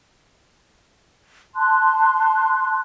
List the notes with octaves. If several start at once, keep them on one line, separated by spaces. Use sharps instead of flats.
A5 C6 F#6